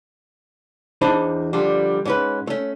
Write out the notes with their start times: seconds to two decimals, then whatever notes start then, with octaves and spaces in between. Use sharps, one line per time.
1.01 E2 D4 D#4 C5 B5
1.53 D3 F3 G3
2.05 G#2 C#4 B4
2.47 A3 C#4